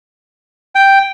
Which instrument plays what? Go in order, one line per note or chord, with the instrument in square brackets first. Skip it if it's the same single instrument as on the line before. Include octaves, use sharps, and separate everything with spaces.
[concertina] G5